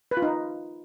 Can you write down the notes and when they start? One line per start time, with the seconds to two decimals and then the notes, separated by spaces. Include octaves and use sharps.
0.11 B4
0.17 F4
0.22 D#4